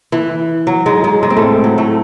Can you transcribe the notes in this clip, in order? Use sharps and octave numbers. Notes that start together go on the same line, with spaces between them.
E3
F#3
G#2 G#3
G#2 G#3
G#2 G#3
C4
A2 A3
F#3
A2 A3